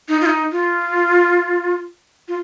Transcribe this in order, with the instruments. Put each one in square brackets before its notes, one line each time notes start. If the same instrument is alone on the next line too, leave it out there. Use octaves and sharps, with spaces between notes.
[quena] D#4
F4
D#4
F4
F4